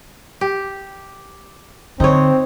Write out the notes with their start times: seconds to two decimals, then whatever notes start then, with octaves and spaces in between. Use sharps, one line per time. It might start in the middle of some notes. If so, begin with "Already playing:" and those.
0.41 G4
2.00 D3 C4 D#4 C#5